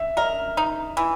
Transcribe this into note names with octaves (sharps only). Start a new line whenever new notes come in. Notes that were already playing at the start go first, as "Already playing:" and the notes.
Already playing: E5
A#4 D#5
D#4
E3